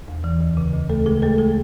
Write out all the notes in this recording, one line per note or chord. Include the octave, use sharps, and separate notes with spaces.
E2
E3
D2
C#3
D2
D2 A3 A4
C#3 G#3 G#4
D2 A3 A4
G#3 G#4